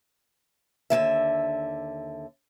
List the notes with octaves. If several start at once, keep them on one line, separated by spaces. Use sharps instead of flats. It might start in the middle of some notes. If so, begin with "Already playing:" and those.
D#2 D3 D#3 E5